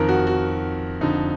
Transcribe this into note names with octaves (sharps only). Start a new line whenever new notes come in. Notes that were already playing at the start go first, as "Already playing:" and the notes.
Already playing: F2 D#3 A#4
F#4
F#4
F2 D3 D#4